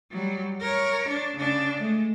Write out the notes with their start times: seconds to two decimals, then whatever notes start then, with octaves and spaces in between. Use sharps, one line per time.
0.12 F#3 G3
0.61 A#4 C#5
1.08 D4
1.37 C#3 D4
1.80 G#3 A3